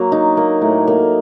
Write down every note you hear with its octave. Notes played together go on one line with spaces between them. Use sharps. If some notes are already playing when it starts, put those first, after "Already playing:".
Already playing: F#3 A#3
D#4
A#3
A2
A#3